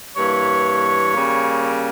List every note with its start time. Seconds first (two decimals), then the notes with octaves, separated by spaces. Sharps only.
0.16 G2 E3 A#3 C#5
1.14 C#3 G3 A#3